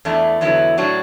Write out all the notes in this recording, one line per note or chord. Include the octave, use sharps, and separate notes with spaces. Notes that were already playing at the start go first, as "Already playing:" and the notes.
E2 E3 A3 D4
E2 D3 F#3 B3 E4
A2 F#3 D4 F#4